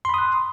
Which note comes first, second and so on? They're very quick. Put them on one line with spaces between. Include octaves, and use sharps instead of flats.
C6 B5 D#6 F#6